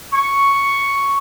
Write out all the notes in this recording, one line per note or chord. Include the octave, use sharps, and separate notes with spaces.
C#6